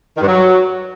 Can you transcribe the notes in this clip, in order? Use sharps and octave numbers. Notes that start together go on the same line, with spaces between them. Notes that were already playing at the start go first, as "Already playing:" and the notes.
D#3
G2
F#3